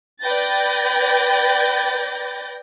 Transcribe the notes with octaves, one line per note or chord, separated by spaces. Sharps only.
B4 D5 G5 G6 A6 A#6